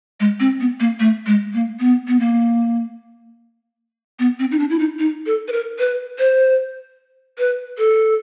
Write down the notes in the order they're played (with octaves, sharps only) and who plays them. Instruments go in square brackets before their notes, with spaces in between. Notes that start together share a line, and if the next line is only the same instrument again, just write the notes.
[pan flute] G#3
C4
B3
A#3
A3
G#3
A#3
B3
B3
A#3
B3
C4
D#4
D4
E4
D#4
D#4
A4
B4
A#4
B4
C5
B4
A4